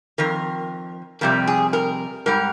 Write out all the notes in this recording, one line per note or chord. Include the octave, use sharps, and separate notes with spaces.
F2 D#3 A#4
F2 C3 G3 A#4
G#4
A#4
G#2 G3 A#4